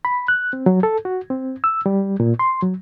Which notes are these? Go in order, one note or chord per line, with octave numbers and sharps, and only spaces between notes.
B5
F#6
C4
F#3
A4
F#4
C4
E6
G3
A#2
C6
F#3